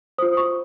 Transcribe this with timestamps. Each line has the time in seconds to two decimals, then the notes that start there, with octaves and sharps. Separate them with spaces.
0.18 F4 C5 D#6
0.37 C#6